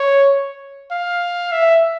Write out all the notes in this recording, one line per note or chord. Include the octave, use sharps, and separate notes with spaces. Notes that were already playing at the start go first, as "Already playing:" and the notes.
Already playing: C#5
F5
E5